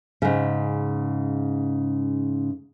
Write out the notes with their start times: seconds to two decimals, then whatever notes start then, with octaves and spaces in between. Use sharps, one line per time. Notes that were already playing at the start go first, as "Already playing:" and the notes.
0.22 G#2 C#3